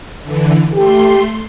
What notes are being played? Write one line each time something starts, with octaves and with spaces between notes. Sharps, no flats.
D3 E3
A3 G4 C6